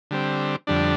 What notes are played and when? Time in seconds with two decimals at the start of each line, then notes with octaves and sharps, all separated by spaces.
0.11 D3 G3 C4
0.67 F2 D3 G3 D4